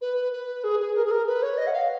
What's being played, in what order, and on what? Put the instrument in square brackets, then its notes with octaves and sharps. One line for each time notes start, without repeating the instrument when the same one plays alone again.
[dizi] B4
B4
G#4
G#4
A#4
G#4
A#4
B4
C#5
D#5
F#5
F5